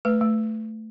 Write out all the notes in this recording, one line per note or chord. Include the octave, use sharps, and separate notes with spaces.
A3 B4
A3